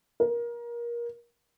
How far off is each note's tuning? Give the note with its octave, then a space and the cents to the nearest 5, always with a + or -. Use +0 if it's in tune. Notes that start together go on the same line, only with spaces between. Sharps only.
A#4 +25